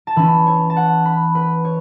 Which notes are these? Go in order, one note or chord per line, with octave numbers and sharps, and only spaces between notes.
A5
E3 C#4 B5
C#5
A5
F#5
B5
B4
C#5